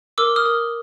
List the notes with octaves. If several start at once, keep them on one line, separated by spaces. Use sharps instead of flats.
A#4 D6 E6
D#6 F6
A#4